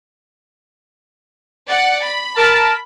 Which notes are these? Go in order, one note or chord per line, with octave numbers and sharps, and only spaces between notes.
D5 F#5
B5
A#4 A5